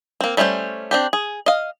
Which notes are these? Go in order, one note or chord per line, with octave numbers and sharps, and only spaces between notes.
A#3 C4
G3 A3 C#4 E4 C5
C4 D4 G4
G#4
D#5 F5